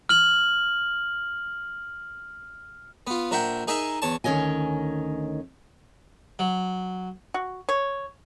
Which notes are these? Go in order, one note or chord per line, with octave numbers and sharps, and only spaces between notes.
F6 F#7
B3 F4
A#1 A#4 E5 F#5 G5 A#5
D#4 G#4 A#4 D#5 E5
E2 C#5 A5
D2 D#3 C#4 C#5 D#5 G#5
F#3
F#4
C#5